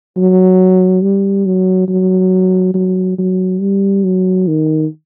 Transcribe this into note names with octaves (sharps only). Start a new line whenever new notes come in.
F#3
G3
F#3
F#3
F#3
F#3
G3
F#3
D#3